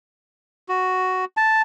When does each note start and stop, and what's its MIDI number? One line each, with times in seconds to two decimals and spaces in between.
0.69 1.25 66
1.37 1.62 81